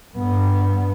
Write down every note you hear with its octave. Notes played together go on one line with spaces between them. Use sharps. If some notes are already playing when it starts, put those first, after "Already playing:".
G2 B3